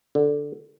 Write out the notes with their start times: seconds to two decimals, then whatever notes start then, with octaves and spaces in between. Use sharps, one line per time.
0.15 D3